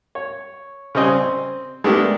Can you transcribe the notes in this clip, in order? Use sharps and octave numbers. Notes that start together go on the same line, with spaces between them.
C#5
C#3 G3 C4 D#5 G#5
C4
G#3 A3 B3 D4 G4 A#4